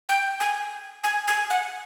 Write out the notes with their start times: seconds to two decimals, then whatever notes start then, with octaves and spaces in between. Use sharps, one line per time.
0.09 G5
0.40 G#5
1.04 G#5
1.28 G#5
1.50 F#5